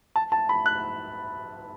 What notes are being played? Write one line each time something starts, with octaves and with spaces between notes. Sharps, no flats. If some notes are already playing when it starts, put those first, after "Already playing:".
A5
A5
B5
F#6